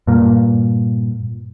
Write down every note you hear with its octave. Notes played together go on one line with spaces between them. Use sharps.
G2 A#2